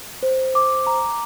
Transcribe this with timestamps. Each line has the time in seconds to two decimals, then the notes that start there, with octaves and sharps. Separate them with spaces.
0.23 C5
0.55 D6
0.87 A#5